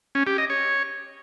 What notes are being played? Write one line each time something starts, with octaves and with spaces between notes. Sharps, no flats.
C#4
G4
D#5
C#5